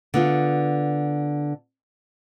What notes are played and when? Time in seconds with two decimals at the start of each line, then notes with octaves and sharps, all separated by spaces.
0.14 D3 B3 F4